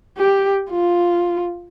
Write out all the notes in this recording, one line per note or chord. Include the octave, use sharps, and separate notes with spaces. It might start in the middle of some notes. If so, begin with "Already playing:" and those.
G4
F4